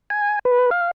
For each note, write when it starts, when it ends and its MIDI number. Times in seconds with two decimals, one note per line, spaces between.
0.10 0.39 80
0.45 0.70 71
0.71 0.91 77